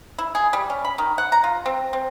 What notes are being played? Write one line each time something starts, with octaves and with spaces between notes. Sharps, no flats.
E4
G#4
G3
C#4
B5
D#3
F#5
A#5
F4
C4
C4